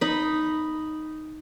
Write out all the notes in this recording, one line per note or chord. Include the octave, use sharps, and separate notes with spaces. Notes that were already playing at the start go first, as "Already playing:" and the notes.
D#4 B5